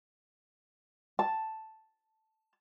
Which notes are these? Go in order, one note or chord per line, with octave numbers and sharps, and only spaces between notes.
A5